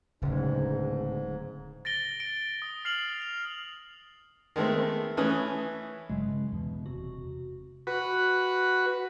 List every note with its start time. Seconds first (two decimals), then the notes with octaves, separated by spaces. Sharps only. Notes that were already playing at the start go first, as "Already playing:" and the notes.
0.22 D1 G#2 C#3
1.85 A6 A#6 D7 G7
2.20 D7
2.62 D#6
2.85 F6 C7 F7 F#7
3.22 F7
4.56 D#3 G#3 A3 B3 C4
5.17 E3 A3 C#4 B4 D#6
6.10 G1 C#3 F#3 G#3
6.27 C#3
6.52 E2 B2
6.86 E1 C3 F#4
7.87 F#4 B4